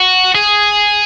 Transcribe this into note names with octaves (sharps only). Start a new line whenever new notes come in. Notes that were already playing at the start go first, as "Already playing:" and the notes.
Already playing: F#4
G#4